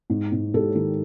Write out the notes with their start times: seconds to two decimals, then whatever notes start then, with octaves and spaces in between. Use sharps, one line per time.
0.10 G#2
0.32 G#2
0.54 G#2 G4 A4
0.75 D#3